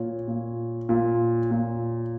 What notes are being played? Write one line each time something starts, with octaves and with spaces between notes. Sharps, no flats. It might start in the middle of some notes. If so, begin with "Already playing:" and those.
Already playing: A#2 C#5
A#2
A#2
A#2